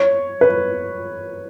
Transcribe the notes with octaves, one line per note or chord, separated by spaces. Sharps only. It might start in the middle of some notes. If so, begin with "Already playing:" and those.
Already playing: C#5
B4